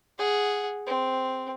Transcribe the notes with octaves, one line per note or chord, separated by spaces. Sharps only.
G#4 F#5
C4